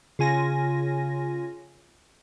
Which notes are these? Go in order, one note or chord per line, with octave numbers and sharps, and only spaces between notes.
C#3 F4 G#5 A#6